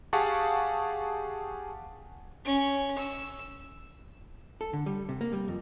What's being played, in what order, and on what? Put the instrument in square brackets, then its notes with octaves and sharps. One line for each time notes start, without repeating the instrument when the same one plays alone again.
[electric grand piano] G4 G#4 F5 F#5 A5 C#6
[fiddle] C#4
E6
[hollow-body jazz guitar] A4
D3
G3
C3
A#3
G3
F2